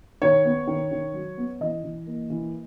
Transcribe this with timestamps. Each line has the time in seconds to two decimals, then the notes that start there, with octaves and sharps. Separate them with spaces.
0.22 D#3 C#5
0.45 B3
0.67 D#3
0.91 D#3
1.14 F#3
1.37 B3
1.61 E3 D#5
1.83 E3
2.06 A#3
2.30 E3